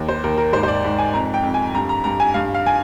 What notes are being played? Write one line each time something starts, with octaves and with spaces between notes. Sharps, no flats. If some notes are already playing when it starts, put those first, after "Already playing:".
Already playing: D#2
C5
D#2 A#4
A#4
G#2 C5
C5
D5
G#2
G#5
F2 A#5
G5
F2
G#5
G2 A#5
A#5
G2 A#5
G#5
G2 F5
F5
G#5